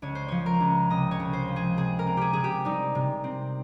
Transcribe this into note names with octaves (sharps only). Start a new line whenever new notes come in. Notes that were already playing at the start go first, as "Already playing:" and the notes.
C#2 C#5
C5
F3 C#5
A#4
C#2
C3 D#5
C#5
C#2
C5
F3
G#4
C3 G#4
A#4
C4
G4 G#4
C3 G#4
G4
G3 D#4
C3
C4